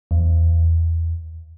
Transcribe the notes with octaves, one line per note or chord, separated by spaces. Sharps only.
E2